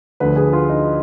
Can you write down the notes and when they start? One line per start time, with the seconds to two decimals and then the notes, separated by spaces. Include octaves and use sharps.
0.20 D2 D3 F3 B4
0.36 G#4
0.53 F4
0.69 D#4